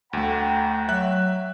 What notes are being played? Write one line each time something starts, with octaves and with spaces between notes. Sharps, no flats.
D2 A3 F#5 G5 A#5
F#3 E5 F#6